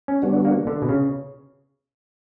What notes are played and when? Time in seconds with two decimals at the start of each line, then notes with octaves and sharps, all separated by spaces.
0.08 C#4
0.22 D3 G3 B3 D4 F#4
0.45 A#3
0.67 D3
0.82 B2
0.89 C#3